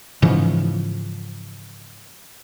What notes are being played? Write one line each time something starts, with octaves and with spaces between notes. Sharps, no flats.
G#2 C#3 E3 F3